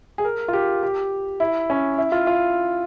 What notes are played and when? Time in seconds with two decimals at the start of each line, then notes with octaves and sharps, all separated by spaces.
0.18 G#4
0.25 A#4
0.48 F4
0.53 G4
0.83 G4
1.40 E4
1.70 C#4
1.98 E4
2.12 F4
2.27 F4